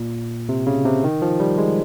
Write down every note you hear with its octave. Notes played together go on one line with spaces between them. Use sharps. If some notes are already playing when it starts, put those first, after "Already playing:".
Already playing: A#2
C3
C#3
C3
D#3
F3
G3
G#3